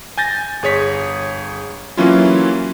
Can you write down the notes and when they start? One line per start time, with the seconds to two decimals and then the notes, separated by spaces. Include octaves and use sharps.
0.17 G#5 G6 A6 A#6
0.62 G1 G#4 C#5 B6
1.97 E3 F#3 A#3 C#4 E4 F4